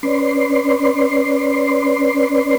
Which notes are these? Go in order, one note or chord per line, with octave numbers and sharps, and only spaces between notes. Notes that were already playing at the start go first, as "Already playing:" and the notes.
C#4 B4 D5 C6